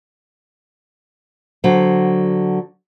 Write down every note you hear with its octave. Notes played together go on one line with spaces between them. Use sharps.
D3 F#3 C5